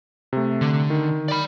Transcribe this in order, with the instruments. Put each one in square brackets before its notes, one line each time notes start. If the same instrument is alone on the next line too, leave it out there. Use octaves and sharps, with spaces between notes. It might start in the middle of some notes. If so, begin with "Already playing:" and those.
[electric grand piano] C3 A3
[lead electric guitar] D3
[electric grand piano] D#3
[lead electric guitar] D5 B5